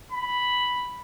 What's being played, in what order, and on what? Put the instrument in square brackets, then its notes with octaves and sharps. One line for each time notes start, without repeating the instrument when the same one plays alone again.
[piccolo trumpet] B5